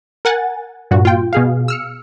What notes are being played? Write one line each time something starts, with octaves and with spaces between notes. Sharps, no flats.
A#4 F#5 G#5 A6
G2 A#2 F#4
F4 G5
B2 G#4 F5
E6 F6 C#7